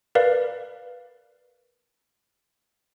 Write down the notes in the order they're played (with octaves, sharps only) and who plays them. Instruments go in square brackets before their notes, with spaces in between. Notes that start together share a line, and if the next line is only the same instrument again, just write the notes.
[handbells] A#4 B4 D5 F5